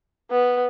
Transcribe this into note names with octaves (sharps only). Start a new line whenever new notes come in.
B3